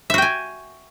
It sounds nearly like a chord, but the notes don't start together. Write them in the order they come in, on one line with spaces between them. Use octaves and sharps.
E5 F#4 G5 G#5